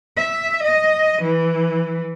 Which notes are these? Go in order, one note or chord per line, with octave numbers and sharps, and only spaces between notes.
E5
D#5
E3